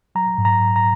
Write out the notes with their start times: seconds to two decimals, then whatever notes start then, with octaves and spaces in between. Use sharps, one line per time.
0.15 F#3 A#5
0.38 G#2
0.45 A#5
0.61 G#2
0.76 A#5